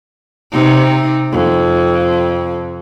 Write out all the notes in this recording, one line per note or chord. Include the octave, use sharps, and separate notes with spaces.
C3 D#4
F2